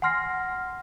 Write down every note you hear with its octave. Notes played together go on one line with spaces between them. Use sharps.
F#5 G#5 C6 F6 A#6 C7